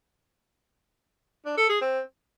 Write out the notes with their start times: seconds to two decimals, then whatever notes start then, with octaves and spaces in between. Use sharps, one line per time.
1.45 D4
1.57 A4
1.69 G#4
1.81 C4